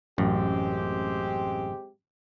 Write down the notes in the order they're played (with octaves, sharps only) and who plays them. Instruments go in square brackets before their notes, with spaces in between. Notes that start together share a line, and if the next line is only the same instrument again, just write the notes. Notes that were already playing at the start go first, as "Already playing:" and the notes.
[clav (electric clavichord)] A1 F#2 [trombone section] G#3 C4 G4